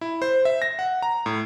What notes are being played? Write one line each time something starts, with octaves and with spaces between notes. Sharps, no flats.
E4
C5
E5
A#6
F#5
A#5
A2